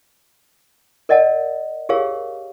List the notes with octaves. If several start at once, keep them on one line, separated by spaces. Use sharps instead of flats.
A#4 D5 D#5 F#5 A5
G4 G#4 A#4 C#5 F5